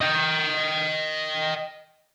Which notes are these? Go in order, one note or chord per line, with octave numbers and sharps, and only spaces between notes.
D#5 G5